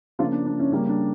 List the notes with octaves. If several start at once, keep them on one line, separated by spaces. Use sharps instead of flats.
C#3 F3 A#3 D4 F4
D4
D4
C#4 E4
C#3 G3 A#3 C#4 E4
D4